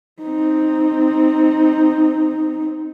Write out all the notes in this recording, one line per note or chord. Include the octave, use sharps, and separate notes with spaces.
C4 D#4